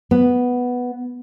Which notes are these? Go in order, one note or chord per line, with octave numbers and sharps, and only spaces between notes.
B3